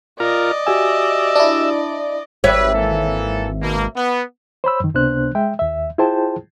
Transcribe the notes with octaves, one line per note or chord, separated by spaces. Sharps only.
F4 A#4 D5 D#5
F#4 G4 E5 G#5
D4 E4
G#1 G3 B4 C#5 E5
E3 A#3 A4
B2 A#3
B3
C5 C#5 B5 E6
F#2 D#3
C#2 C3 B3 D4 C5 F#6
G#3 E5 G5
D#2 E5
E4 F4 G#4 C5 G5 A5